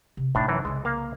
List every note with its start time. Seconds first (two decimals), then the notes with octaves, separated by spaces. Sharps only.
0.17 C3
0.35 A2 C3 D4 D#4
0.48 F#2 E3
0.65 C2 C#3 G#3
0.85 A#3 F5